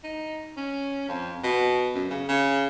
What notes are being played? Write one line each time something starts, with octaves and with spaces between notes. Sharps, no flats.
D#4
C#4
F2
B2
F#2
C#3
C#3